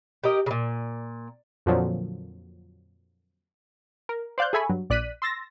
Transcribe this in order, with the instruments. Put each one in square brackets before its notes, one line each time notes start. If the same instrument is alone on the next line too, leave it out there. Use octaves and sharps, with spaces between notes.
[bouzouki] G4 A#4 D#5
A#2 C#3
[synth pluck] F2 A#2 D3 F3 F#3
[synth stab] A#4
C5 D5 F5 F#6 G6
G#4 A4 E5 G#5 B5 C#6
G2 F#3
A#1 D5 F#6 B6 D#7
C6 E6 A6 A#6